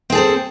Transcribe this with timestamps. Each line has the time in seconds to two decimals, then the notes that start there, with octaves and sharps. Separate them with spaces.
0.10 C4
0.12 G#4
0.15 A4
0.18 C5